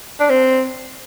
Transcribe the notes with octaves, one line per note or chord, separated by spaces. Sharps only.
D4
C4